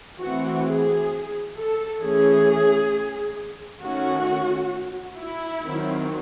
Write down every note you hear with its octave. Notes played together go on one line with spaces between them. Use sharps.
E3 A3 C4 F#4
G#4
A4
E3 A3 C#4 G#4
D#3 A3 C#4 F#4
E4
D#3 F#3 C4